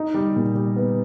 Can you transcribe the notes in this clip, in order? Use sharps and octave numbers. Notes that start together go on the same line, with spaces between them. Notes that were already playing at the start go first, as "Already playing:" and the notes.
Already playing: D#4
G3
A#2
G3
B3